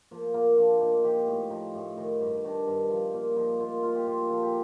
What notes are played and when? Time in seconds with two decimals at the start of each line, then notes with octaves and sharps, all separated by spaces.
0.11 F3 A#3
0.34 A#2 A#3
0.57 F3 D4
0.80 A#2 D#4
1.04 F3 G4
1.27 A2
1.50 F3 D#4
1.74 A2
1.97 D#3
2.21 G2
2.44 D#3 D4
2.67 G2
2.90 F3
3.14 A#2
3.36 F3 D#4
3.60 A#2 F4
3.83 F3 F4
3.95 G4
4.07 A#2 F4
4.30 F3 A4
4.43 G4